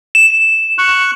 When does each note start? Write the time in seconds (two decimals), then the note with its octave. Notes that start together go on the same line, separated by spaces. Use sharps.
0.15 E7
0.78 C#6 F#6